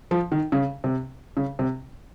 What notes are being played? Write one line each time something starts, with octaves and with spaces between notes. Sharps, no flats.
F3
D#3
C#3
C3
C#3
C3